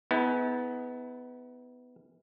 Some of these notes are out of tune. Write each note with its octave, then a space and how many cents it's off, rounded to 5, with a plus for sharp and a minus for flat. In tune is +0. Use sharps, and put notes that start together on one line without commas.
B3 +10 E4 -40 G#4 +35